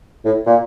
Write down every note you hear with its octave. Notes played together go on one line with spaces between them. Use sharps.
A2
A#2